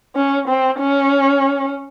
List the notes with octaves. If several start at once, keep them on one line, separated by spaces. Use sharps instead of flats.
C#4
C4
C#4